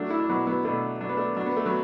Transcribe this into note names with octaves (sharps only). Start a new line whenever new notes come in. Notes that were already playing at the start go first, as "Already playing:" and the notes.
Already playing: F#3 A3 D4
E4
D4
B2 F#3 B3
F#3 B3
B2 A3 D4
F#3 D4
B3
A3 D4
F#3 D4
B3
A3
F#3 B3